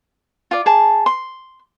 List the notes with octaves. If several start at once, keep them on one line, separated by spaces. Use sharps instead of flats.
F4 D5
G#4 A5
C6